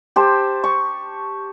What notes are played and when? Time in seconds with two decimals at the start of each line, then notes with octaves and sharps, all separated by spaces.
0.16 G4 C5 A5
0.64 C#6